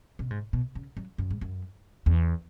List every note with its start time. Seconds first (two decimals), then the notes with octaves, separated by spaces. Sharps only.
0.19 B2
0.31 G#2
0.53 B2
0.75 C#3
0.97 F#3
1.18 F#2
1.31 G#2
1.41 F#2
2.06 E2